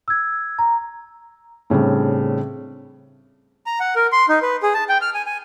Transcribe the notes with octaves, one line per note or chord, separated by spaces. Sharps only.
E6 G#6
A#5
A2 C#3 G3 C4 D4
A#5
F#5
A#4
C6
D#4
B4
G#4
A5
G5
F6
G#5
G#5